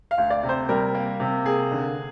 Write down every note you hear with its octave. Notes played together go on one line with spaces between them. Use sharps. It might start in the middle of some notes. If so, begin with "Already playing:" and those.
F5
D2
D5
C3
C5
G3 A#4
A#3
C3
A#3 G#4
D3